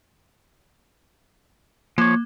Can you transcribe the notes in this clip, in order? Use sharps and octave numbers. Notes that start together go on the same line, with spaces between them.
F3 A#3 C#5